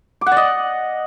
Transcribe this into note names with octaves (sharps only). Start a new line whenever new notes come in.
D6
F#5
D5
D#5